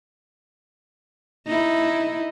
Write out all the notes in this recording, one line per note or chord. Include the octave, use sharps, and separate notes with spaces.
D#4 E4